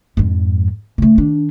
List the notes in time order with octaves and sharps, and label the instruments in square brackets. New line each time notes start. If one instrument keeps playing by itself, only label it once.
[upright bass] F2 G#2
C#3 A3
D#3 D4